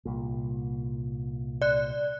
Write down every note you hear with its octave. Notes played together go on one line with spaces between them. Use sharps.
C2 A#2
D5 F#6